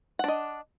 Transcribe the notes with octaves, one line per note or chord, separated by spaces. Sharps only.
D4 D#5 F#5